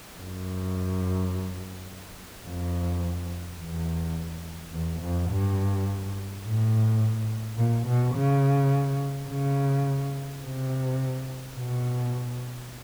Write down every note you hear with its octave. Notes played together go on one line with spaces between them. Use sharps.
F#2
F2
E2
E2
F2
G2
A2
A#2
B2
C#3
C#3
C3
B2